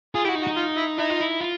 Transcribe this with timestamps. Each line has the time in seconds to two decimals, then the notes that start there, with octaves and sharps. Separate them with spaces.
0.15 F4 G#4
0.24 E4 F#4 G4
0.35 D#4
0.43 F#4
0.47 D#4
0.56 F4
0.77 E4
0.98 D#4 E4
1.10 F4
1.21 E4
1.41 F4